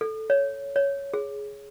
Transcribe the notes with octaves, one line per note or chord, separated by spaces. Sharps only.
A4
C#5
C#5
G#4